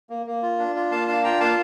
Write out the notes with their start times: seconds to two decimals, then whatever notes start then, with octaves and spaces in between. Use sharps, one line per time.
0.10 A#3
0.26 A#3
0.42 F4
0.59 D4
0.75 F4
0.91 A#3 F5 A5
1.08 D4 F5 A5
1.24 F4 G5 A#5
1.40 A#3 F5 A5